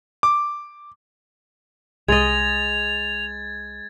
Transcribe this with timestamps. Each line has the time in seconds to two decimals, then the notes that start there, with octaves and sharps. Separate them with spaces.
0.23 D6
2.08 C2 G#3 D#5 G#6 A6 F7